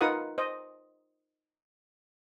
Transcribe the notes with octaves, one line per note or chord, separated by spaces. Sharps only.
D#4 F4 A#4 B4 F#5 D#6
C5 D#5